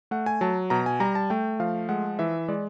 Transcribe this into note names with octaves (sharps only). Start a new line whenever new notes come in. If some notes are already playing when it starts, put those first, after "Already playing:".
A3 F#5
G#5
F#3 A5
B2 A#5
G#5
G3 A#5
A5
A3 G5
F3 F5
G#3 F#5
E3 E5
G#3 D5